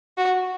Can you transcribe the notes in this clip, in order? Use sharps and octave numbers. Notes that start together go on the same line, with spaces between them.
F#4